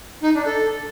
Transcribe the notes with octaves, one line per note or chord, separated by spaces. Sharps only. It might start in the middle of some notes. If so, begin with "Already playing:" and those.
D#4
D4
A4